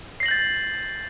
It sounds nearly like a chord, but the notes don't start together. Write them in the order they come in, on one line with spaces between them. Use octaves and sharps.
C7 A#6 F#7 G6 A6